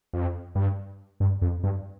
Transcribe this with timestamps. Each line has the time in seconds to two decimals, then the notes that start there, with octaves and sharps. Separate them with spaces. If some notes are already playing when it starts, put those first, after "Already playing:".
0.13 F2
0.55 G2
1.20 G2
1.42 F2
1.63 G2